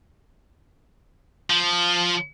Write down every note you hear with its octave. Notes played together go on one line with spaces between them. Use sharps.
F3